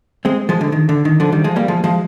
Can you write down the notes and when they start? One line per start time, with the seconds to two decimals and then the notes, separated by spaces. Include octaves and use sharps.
0.25 G#3 C4
0.49 F3 G#3
0.61 D3
0.72 D#3
0.89 D3
1.05 D#3
1.20 D3 F3
1.32 D#3 G3
1.44 F3 G#3
1.56 G3 A#3
1.68 F3 G#3
1.84 F3 G#3